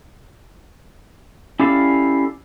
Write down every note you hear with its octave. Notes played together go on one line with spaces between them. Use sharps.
C#4 E4 G4 A4 D5 F5